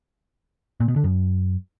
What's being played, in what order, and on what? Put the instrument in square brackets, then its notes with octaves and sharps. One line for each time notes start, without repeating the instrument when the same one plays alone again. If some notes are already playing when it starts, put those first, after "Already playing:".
[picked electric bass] A#2
B2
D3
F#2